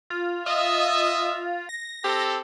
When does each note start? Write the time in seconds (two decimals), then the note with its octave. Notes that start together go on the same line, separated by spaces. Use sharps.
0.10 F4
0.46 F4 D#5 E5
1.69 A#6
2.04 C4 G4 A4